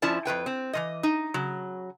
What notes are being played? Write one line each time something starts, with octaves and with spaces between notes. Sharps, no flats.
F2 F3 C#4 E4 D5 A5
F2 G#2 B4 G5
C4
E3 F3 D#5
D#4
C#3 F#3